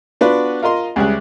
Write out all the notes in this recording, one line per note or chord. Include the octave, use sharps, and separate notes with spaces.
B3 D4 F4 F#4 B4
F4 A#4 D#5 C6
C#2 G3 G#4 E5 F#6